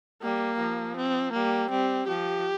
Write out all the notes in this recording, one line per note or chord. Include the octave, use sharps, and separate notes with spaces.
G3 A#3
F3
C4
G3 A#3
G3 C4
F3 G4